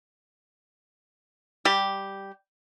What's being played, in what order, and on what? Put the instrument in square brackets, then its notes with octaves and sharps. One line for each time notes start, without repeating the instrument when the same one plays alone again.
[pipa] G3 G4